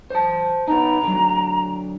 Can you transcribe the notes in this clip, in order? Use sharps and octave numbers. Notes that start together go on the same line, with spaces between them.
C5 A5
B3 D#4 A#5
D3 F#3